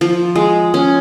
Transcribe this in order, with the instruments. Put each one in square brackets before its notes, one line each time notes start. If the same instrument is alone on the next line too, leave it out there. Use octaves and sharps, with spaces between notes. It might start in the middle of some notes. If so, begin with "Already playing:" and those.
[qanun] F3
G#3
C#4